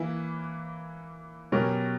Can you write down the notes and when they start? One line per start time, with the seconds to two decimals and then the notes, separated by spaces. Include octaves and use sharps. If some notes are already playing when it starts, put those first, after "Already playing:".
Already playing: E3 A#3 E4 B4
1.52 B2 F#3 C#4 G4 A#4